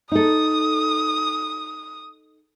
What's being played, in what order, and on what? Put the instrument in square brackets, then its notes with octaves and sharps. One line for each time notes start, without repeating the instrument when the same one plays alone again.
[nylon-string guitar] D#4 A4 [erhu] D#6